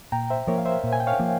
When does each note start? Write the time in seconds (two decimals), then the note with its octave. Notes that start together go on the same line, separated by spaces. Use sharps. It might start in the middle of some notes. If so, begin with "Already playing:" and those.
0.12 A#2 G5 A#5
0.30 C5 E5
0.47 F3 A#3 A#4 C#5
0.58 F5
0.65 C5 E5
0.84 A#2
0.93 G#5
1.00 G5
1.07 C#5 F5
1.19 F3 A#3